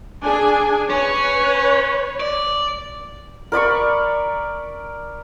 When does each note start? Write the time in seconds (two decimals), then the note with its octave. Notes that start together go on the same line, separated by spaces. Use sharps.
0.24 D4 G#4 G#5
0.90 C#4 B4 C#5
2.20 D5
3.52 A#4 D5 B5 C#6